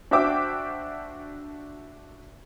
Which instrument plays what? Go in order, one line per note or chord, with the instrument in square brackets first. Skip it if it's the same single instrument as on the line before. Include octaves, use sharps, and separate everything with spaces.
[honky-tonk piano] D4 F#4 C5 E5 G5 D6